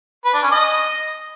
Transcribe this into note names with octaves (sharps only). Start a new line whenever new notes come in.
B4
D4
C#4
D#5